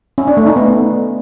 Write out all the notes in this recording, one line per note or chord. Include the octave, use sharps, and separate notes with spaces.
C#4
D4
A3
D#4
B3